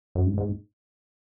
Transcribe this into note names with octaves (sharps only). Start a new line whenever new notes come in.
F#2
G#2
G#2